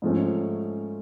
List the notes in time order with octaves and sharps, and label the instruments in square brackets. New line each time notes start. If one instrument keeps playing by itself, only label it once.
[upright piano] G#2 F3 A3 C#4